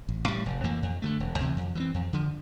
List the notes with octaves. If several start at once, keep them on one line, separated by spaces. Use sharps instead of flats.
A1
A2 G3
F1
F2 E3 A#3
F2
D3 F3 A3
E1
D2 C3 E3
F2
E3 G3 C4
F2
D3 F3